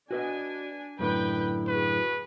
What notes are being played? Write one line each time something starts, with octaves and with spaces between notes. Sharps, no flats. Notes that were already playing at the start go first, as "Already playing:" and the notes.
D4 F#4 B4 D#5 G#5
F#2 A2 D3 B4 G5
F#4 G#4 B4